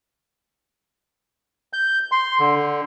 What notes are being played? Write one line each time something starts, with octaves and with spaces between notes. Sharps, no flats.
G6
C6
D3